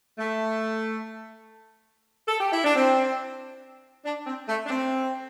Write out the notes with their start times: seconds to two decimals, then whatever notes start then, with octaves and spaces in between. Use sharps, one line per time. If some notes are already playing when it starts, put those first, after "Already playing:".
0.19 A3
2.28 A4
2.40 G4
2.53 E4
2.65 D4
2.76 C4
4.06 D4
4.27 C4
4.49 A3
4.66 D4
4.71 C4